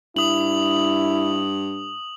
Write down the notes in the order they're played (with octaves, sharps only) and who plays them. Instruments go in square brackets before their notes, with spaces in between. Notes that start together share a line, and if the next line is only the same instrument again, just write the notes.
[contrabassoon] G2 [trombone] E4 [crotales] D#6 F#7